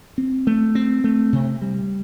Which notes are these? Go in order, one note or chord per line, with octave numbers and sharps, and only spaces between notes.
C4
A3
C4
A3
C3
G3